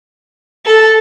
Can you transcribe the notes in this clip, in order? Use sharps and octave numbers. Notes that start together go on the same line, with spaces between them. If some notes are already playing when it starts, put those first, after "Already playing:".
A4